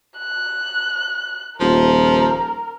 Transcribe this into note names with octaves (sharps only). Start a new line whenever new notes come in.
F#6
D#1 F3 A#4